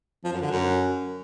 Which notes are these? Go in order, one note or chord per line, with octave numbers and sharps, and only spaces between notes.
F3
F#2
D3
F#2